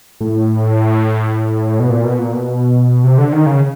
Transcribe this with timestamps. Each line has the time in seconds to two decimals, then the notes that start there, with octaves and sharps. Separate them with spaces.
0.21 A2
1.80 B2
1.90 A#2
2.05 B2
2.19 A#2
2.33 B2
3.04 C3
3.18 D3
3.32 D#3
3.46 C#3